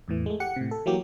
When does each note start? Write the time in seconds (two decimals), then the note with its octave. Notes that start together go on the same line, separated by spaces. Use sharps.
0.08 E2 A2 E3
0.26 G#3 A3
0.40 G4 F#5 C#7
0.56 A2 C3
0.71 A4
0.86 E3 F#3 A#3 G4